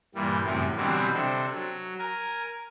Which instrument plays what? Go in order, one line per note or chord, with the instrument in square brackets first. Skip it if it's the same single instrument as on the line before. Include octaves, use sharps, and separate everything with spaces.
[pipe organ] G2 A#2 E3 G3
F#2 A2 C3 E3
B2 D3 E3 F#3 G3 C4
C3 C4 D4 A4
F#3
A#4 G#5